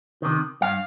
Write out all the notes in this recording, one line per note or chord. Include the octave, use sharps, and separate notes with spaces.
C3 D#3
G2 F5